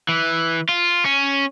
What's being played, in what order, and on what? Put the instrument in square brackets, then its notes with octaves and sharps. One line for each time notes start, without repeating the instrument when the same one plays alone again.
[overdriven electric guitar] E3
F4
C#4